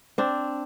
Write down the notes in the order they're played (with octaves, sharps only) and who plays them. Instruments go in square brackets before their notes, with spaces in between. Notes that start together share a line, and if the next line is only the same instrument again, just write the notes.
[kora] C4 D4